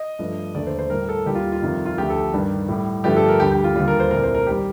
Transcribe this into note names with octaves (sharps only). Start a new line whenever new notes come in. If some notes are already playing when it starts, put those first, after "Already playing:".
Already playing: D#5
G2 F3 A3
D#2 D3 A3 D5
C5
C5
A2 G3 A#4
A4
D#2 D#3 G3 G4
F4
F4
F2 C3 D#3 G3
F4
D2 D3 F3 A3 G4
A4
G2 D#3 G3
A2 G3
G2 D3 F3 A3 G4
A4
A#4
D2 D3 G3 G4
G4
F4
D#2 D3 G3 F4
A#4
C5
C2 A#2 A3 A#4
C5
A#4
D#3 G3 G4